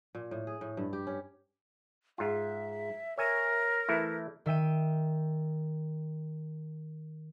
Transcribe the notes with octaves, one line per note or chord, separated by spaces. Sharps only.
A#2
A2
G#4
A2
G2
G4
C#4
G#2 F4 E5
A#4 C#5 E5 G#5
E3 A3 E4
D#3 E5 G5 D#7